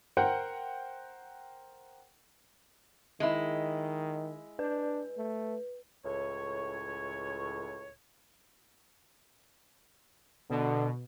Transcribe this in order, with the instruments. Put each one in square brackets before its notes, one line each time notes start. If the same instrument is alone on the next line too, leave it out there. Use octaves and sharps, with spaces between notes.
[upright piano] A#4 C5 F#5 G5
[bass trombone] D#3 [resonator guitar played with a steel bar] G#3 E4
[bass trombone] D4 [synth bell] B4
[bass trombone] A3
[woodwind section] C#2 A2 C#5
[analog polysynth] B2 [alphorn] D3